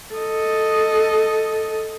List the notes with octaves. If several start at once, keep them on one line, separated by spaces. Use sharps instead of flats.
A4 D#5